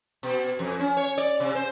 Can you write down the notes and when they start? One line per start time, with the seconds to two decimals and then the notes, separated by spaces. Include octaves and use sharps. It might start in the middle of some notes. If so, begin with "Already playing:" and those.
0.23 B2
0.59 F2
0.80 C#4
0.97 C#5
1.18 D5
1.40 C3
1.55 C5